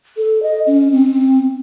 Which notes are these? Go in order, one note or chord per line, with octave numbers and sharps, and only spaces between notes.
A4
D#5
C#4
C4